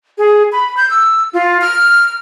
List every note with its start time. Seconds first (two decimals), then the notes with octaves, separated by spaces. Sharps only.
0.18 G#4
0.52 B5
0.77 G6
0.90 E6
1.33 F4
1.61 F6